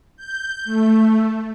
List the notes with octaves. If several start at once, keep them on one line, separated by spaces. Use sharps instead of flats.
G6
A3